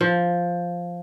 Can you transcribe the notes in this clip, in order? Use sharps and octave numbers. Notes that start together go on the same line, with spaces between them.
F3